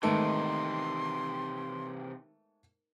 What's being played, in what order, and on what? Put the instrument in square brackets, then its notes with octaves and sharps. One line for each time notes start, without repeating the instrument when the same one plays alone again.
[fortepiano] G#2 A3 B3 [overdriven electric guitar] C3 E3 [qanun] D#3 [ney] C6